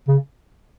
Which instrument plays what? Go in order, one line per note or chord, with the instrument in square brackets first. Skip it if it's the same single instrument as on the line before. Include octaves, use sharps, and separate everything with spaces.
[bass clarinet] C#3